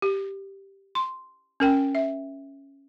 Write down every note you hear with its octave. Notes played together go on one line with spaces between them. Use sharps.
G4
C6
C#4 A#4 G5
E5